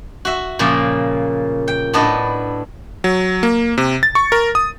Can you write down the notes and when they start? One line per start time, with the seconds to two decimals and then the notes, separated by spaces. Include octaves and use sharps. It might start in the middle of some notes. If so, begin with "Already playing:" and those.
0.25 F#4 E5
0.59 A#2 C#3 F3 A#3
1.68 G5
1.93 A2 B3 D4 B4 D#5 A5
3.04 F#3
3.43 A#3
3.78 C3
4.03 A6
4.15 C#6
4.32 A#4
4.55 D#6